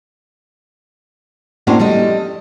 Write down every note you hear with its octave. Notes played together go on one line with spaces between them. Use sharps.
A2 A#3 C#4 D4 F#4 C5
G3 A4 D#5